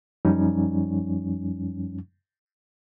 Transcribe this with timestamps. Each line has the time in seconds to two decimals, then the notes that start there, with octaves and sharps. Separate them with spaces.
0.25 F#2 F3 G3 C#4 D#4